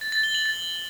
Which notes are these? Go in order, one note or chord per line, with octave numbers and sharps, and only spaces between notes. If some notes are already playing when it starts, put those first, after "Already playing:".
A6
A6
G7
F#7
A6